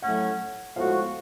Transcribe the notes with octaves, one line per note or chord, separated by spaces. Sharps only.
A2 F#3 A3 C#4 F#5
A2 F3 G#3 B3 F#4 F5